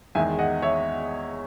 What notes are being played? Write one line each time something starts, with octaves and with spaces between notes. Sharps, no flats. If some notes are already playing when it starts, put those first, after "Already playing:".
E2 D#3 G#3 E5 G#5
D#5 F#5
C#5 E5